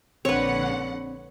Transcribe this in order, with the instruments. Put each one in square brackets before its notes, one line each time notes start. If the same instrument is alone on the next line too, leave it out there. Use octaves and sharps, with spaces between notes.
[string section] A#1 D3 F#5 [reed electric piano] C4 [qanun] B4 C#5